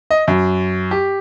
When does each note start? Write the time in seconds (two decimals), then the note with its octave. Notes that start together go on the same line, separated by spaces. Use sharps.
0.11 D#5
0.28 F#2
0.91 G4